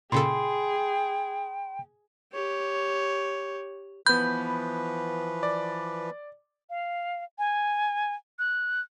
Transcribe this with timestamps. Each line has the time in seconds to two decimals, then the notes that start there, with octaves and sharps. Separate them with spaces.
0.12 A#2 C#3 G#4 A4 G5 B5 C6
2.33 G4 C#5
4.07 E3 F3 B3 B4 B5 G6
5.43 D5
6.70 F5
7.39 G#5
8.39 F#6